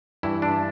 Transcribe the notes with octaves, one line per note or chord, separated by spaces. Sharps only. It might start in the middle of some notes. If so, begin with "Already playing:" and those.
G2 E3 E4
D4